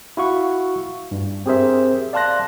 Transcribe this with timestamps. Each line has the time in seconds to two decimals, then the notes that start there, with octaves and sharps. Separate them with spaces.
0.17 E4 F#4 F5 C#6
1.11 G2
1.46 C4 G4 G#4 A#4 C5 E5
2.13 D5 F5 A5 C6 F#6 A#6